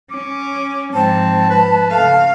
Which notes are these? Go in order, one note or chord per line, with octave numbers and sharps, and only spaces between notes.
C#4 D6
G#2 F3 C4 A5
B4
C#3 A3 F5